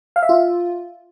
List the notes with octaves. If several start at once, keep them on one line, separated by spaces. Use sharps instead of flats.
F5
E5
F4